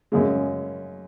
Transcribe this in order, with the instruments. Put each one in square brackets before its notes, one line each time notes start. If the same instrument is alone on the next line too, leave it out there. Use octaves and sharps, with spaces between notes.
[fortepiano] F#2 C#3 G#3